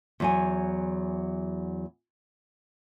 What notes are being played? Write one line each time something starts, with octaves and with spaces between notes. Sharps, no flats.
E2 F#3 G#5